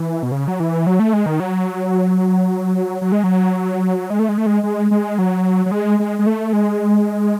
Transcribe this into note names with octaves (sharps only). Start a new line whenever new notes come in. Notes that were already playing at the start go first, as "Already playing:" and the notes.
Already playing: E3
B2
C#3
F#3
E3
F#3
A3
G#3
D#3
F#3
F#3
G#3
F#3
G#3
A3
G#3
A3
G#3
G#3
G#3
F#3
F#3
G#3
G#3
G#3
A3
G#3